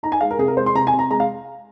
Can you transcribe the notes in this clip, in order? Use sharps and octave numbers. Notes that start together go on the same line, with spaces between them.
D#4 A#5
G#5
G#3 F5
A#4
C3 G#4
A#4
G#3 C5
C6
C3 A#5
G#5
C3
A#5
G#3 A#5
F5